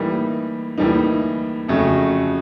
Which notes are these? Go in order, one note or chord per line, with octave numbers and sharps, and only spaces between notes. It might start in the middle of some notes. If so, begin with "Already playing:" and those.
Already playing: A2 E3 G3 A#3 D#4
A2 E3 G3 A#3 D#4
F2 C#3 F#3 A3